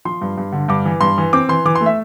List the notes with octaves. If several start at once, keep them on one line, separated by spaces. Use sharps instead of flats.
F3 C6
G2
G2
D3
G2 D6
E3
G2 C6
E3
C4 D6
E3 C6
E3 D6
C6
A3
E5